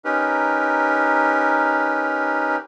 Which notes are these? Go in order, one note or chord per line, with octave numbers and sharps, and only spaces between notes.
C#4 D#4 G4 A#4 B4